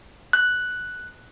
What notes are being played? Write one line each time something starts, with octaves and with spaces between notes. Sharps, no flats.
F#6